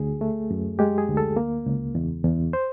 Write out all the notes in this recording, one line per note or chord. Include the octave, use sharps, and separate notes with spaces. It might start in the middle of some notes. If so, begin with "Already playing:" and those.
Already playing: D2 G#4
A3
F#2
G#3 G4
G#4
D2
A4
A#3
C#2
E2
E2
C5